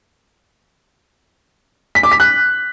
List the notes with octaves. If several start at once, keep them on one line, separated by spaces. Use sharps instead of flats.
B6
D6
B6
F#6